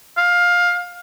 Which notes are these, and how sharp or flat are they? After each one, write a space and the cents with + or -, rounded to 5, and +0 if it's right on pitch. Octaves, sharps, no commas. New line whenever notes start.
F5 +15